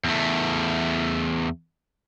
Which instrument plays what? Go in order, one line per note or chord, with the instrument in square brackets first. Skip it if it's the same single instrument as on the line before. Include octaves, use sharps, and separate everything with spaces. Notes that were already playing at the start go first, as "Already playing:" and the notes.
[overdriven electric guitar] E2 A3